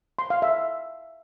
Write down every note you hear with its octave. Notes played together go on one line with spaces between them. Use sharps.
C6
F5
E5